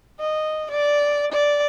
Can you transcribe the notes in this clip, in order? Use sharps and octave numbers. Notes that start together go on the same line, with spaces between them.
D#5
D5
D5